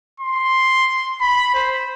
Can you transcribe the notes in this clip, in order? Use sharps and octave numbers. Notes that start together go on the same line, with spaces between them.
C6
B5
C5